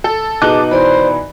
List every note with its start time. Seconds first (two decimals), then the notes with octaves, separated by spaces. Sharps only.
0.04 A4
0.42 B2 D#4 G#4 D#5 A5 D6 F#6 G7
0.71 E3 C5 D5 B5